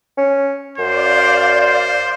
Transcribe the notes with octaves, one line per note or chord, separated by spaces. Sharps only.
C#4
F#2 C5 D5 F5
C5